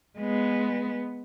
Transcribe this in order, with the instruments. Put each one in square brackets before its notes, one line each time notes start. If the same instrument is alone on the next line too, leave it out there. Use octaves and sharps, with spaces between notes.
[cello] G#3 B3